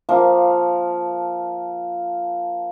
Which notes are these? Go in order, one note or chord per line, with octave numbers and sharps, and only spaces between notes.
F3 A#3 F5